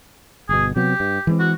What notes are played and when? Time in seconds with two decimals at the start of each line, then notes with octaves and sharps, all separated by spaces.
0.49 G1 B2 G#4
0.76 C3 F#3 B3 G4
1.00 G2
1.27 E3 G#3 C4
1.39 F#4